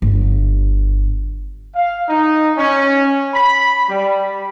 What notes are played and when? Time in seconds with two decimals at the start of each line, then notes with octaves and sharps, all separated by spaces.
0.02 G1
1.75 F5
2.09 D#4
2.58 C#4
3.34 B5
3.89 G3